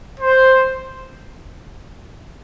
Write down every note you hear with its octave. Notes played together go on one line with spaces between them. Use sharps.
C5